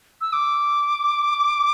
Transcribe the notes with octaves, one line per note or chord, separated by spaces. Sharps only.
E6
D6